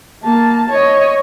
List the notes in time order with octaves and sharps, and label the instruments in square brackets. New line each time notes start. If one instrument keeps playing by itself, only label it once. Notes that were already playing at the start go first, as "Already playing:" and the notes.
[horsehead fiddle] A#3 A5
C#5 D#5